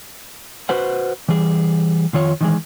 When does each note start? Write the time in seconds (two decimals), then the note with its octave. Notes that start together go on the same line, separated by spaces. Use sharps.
0.69 F#4 B4 C5 F#5
1.29 E3 G3 G#4
2.13 F2 D#3 F4 C#5
2.41 D#3 E3 G#3